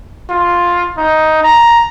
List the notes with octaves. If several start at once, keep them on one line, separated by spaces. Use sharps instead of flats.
F4
D#4
A#5